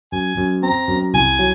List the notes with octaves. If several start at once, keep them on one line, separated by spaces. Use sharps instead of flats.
F#2 G#5
F#2
C4 A#5
F#2
C2 G#5
F#3